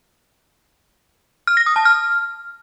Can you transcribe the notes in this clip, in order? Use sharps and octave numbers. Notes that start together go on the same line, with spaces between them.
F6
A#6
D#6
A5
F6